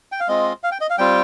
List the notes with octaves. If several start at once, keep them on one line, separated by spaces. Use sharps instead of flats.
G5
F5
G#3 C4 F4 D#5
F5
G5
D#5
F5
G3 C4 F4 G5